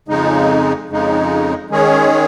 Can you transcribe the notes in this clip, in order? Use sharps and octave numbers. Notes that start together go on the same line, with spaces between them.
F2 C#3 G#3 D#4
F2 C#3 G#3 D#4
D#3 G#3 C#4 G#4 C#5